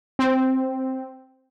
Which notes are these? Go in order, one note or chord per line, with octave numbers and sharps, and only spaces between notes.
C4